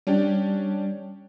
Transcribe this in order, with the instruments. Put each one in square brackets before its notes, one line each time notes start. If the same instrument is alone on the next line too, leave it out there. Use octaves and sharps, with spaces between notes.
[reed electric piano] G3 [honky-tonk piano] C#4 D4 G4